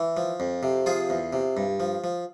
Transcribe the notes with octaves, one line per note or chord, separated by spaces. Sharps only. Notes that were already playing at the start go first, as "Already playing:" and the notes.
Already playing: E3
F3
F2
C3
F3 F4 G#4
E2
C3
G2
F3
F3